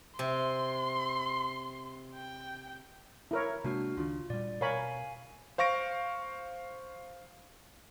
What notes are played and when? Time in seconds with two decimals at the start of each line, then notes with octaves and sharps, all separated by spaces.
0.19 C3 C6
2.14 G5
3.31 E4 A#4 C#5
3.64 C3 G#3 A#3 D4 F#4 F6
3.97 C#2 D#3 D4 F4
4.30 A#2 G3 D5
4.61 B2 A#4 C#5 F5 G#5 B5
5.58 C5 F5 C#6 A#6 D7